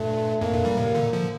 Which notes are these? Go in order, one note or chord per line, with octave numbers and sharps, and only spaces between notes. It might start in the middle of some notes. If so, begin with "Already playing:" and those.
Already playing: G2 A#2 A3
F2 A2 A#3
G2 A#2
E3 G3
A2 C3
A#2 D3
D3 F3